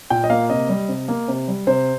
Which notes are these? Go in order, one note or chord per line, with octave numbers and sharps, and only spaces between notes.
A#2 G5
D#5
A#3 F5
C3 D#5
G3
C3
A#3
C3
G3
C3 C5